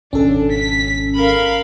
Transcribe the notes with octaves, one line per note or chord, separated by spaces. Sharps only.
G#1 B2 C#4 D4 A4
B6
A#4 F5 B5